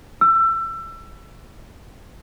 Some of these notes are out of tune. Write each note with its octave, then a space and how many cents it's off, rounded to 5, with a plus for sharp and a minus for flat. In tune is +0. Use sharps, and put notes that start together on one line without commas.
E6 +25